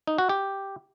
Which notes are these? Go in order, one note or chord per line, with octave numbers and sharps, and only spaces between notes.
D#4
F#4
G4